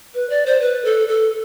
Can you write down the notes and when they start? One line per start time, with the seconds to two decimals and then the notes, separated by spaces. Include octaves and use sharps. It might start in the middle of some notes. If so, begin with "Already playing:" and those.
0.14 B4
0.30 D5
0.46 C5
0.61 B4
0.85 A4
1.08 A4